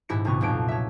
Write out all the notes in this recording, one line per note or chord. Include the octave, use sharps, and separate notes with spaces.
D#1 G#2 E4 G4 A#6 C#7
D#1 C2 C3 B3 F4 C#6
B1 F2 A#2 D7
C#5 E5